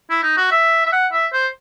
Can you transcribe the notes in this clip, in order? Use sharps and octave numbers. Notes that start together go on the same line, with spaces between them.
E4
D#4
F#4
E5
E5
F#5
E5
C5